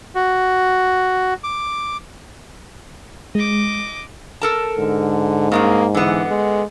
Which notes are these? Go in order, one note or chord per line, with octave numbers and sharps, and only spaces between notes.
F#4
D6
G#3 D#5 D6
A4 A#4 A5
G#2 D3
G2 G#3 A#3 C#4
D3 E3 B3
G#3